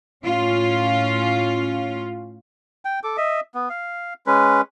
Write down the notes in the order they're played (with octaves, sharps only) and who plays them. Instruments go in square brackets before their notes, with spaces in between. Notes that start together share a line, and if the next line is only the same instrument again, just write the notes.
[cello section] A2 C#4 F4
[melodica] G5
A4 D6
D#5 E5
B3
F5
G#3 C#4 B4